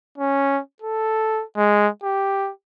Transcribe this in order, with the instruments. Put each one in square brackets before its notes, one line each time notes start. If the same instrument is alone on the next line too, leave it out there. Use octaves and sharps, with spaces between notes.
[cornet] C#4
A4
G#3
G4